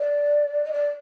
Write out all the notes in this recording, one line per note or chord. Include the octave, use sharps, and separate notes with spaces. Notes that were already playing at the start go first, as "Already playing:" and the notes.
Already playing: D5
D#5
D5